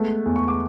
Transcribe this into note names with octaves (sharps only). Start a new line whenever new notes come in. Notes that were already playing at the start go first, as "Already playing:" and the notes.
Already playing: G#3 A3 B3
E2
C#6
D6